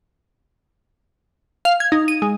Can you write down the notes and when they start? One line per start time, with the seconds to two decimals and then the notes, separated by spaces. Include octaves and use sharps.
1.65 F5
1.80 G#6
1.92 D#4
2.08 D#7
2.22 G#3